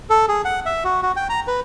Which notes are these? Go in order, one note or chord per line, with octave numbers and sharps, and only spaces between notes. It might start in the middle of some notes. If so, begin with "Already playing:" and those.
A4
G#4
F#5
E5
F#4
F#4
G5
A#5
B4